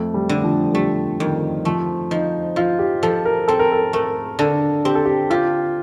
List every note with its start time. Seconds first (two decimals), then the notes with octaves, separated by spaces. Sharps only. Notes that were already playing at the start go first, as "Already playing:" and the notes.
Already playing: F2 A3
0.14 G3
0.29 D3
0.44 F3
0.74 G3 A3
1.20 F2 D#3
1.65 F3 A3
2.11 F3 D#4
2.56 F3 F4
2.79 G4
3.03 F3 A4
3.25 A#4
3.48 C4 A4
3.59 A#4
3.72 A4
3.93 A3 A#4
4.39 D3 A4
4.85 C4 G4
4.95 A4
5.05 G4
5.30 F4 G4